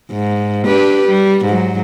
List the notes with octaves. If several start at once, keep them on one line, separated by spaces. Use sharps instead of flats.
G#2
D4 G4 B4
G3
G#2 F#3